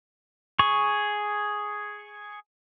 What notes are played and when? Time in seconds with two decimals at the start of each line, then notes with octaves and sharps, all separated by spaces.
0.59 G#4 C#6